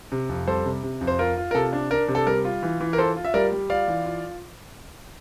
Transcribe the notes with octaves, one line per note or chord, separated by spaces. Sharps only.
C3
F2
G3 A4 C5
C3
C3
F2
C5
F4 A#4
F4
A#4
C3 A4
D4
D4 A#4
C3
A4
G3 A#4
F4
E3
E3
A#4
F4 A4 C5
F4
E5
G3 A#4 D5
G3
F4 D5 F5
E3
F4